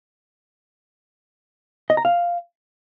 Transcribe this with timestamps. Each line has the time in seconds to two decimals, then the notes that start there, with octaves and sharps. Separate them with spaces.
1.90 D#5
1.97 A#5
2.05 F5